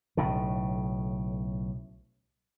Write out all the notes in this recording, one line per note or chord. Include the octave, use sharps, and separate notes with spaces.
B1 A2 C#3